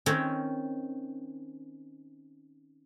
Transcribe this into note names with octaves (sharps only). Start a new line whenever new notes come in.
D#3 C4 C#4 C#5